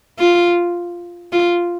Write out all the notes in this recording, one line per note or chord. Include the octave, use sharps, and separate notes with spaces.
F4
F4